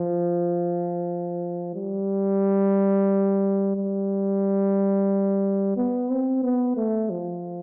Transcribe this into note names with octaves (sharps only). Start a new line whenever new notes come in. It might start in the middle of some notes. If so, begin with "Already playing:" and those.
Already playing: F3
G3
G3
B3
C4
B3
A3
F3